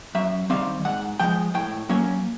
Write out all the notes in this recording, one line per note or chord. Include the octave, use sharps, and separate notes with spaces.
F#2 E5
D#3 G3 C4 F5
G#2 F#5
F3 G#3 G5
A2 G5
F#3 A#3 C#4 C#5